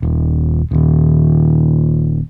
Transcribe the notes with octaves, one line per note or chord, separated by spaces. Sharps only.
D#1
D#1 D#2